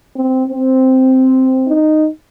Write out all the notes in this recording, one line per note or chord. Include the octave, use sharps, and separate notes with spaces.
C4
C4
D#4